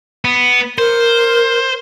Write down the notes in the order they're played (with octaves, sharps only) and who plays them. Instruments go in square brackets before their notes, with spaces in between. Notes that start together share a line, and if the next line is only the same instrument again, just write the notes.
[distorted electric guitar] B3
[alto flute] A#4 [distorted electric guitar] C5